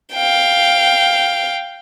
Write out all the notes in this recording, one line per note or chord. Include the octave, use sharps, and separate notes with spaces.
F5 G5